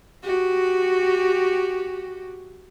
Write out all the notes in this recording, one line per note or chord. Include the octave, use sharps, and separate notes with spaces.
F#4 G4